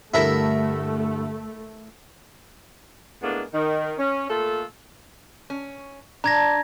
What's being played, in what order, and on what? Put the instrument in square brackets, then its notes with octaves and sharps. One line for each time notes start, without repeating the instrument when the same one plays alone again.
[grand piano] G2 D3 A4 [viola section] A3 [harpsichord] E4 A#4
[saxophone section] A2 G#3 A#3 B3 D4
D#3
C#4
A#2 A3 F4 A4
[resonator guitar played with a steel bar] C#4
[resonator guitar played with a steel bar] D4 [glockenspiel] A#5 G#6 A#6